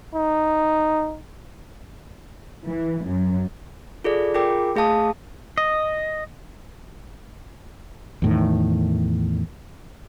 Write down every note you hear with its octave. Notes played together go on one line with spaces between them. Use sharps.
D#4
E3
F#2
F4 G#4 A4 D5
F4 G#4 A#4 G5 D6
A3 G#4 F5 A5 D#6
D#5
E2 A2 D#3